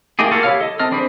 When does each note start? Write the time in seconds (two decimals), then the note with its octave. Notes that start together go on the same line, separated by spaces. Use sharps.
0.19 A3 A#3 D#4 G4 G#4
0.31 A#3 F4 F#4 A4
0.43 E4 G4 C#5 F5 F6
0.60 A4 D#5
0.80 C4 A4 D#5 F6
0.92 C4 D4 G#4 B4 C5